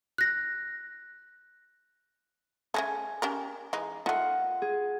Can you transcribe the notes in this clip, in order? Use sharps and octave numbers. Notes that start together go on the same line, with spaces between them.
F#6 A#6
C#3 G3 A3 G#5
C#4 G4 A#4
E3 G#3 D#4
D#3 A3 F4 D#5 F#5
G#4